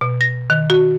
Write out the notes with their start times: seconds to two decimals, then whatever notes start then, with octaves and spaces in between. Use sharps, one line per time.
0.01 B2
0.21 A#6
0.50 D#3
0.70 F#4